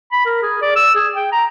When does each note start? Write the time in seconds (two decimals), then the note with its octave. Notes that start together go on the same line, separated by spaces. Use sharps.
0.12 B5
0.25 A#4
0.43 G#4
0.62 D5
0.76 E6
0.95 G#4
1.15 G5
1.32 A#5